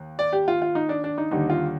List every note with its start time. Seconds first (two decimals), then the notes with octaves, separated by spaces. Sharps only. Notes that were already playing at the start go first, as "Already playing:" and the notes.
Already playing: D#2
0.19 D5
0.33 G4
0.48 F4
0.62 F4
0.75 D#4
0.89 D4
1.04 D4
1.18 D#4
1.31 D#2 D3 G3 D#4
1.50 F4